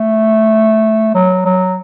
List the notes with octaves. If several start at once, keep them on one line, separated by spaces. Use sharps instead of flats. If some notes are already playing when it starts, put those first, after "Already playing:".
Already playing: A3
F#3
F#3